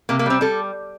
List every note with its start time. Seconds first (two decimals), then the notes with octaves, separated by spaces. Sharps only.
0.09 C3 A#3
0.19 A#3
0.26 G3 C4
0.41 G3 A4